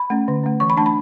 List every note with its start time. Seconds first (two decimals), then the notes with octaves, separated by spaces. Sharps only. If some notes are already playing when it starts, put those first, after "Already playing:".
Already playing: B5
0.10 A3 C#4
0.28 D3
0.43 A3 C#4
0.60 E3 C#6
0.70 B5
0.77 A3 D4 A5
0.86 B5